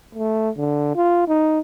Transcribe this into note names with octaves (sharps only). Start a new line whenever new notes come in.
A3
D3
F4
D#4